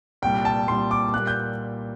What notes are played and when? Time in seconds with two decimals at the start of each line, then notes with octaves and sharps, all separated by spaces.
0.22 C2 A#2 G3 G5
0.45 A5
0.68 C2 A#2 G3 C6
0.91 D6
1.13 A#2 G3 A#3 F#6
1.27 G6